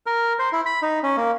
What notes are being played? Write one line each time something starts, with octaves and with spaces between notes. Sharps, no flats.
A#4
C5
E4
B5
D#4
C#4
A#3